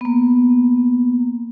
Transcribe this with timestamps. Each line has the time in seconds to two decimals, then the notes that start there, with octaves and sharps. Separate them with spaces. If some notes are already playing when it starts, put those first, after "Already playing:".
0.01 A#3 B3